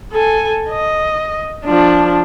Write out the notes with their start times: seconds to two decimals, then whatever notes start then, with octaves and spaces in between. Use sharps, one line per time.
0.12 A4 G#5
0.69 D#5
1.65 F3 D4